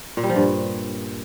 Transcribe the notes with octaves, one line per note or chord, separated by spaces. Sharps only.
A#2
G3
F3
G2